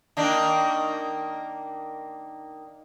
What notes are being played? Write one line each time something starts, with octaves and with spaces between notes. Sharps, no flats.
D#3 A#3 D4